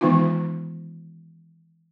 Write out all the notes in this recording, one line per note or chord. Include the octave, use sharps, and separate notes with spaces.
D#3 E3 G#3 B3 D#4 F4